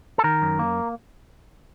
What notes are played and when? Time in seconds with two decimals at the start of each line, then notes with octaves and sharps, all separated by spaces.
0.18 A4
0.24 D#3 A#4
0.42 F#2
0.59 A#3